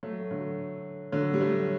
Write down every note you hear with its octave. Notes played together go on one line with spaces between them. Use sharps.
F#3 A3
D3 F#3
D3 F#3
G3
F#3 A3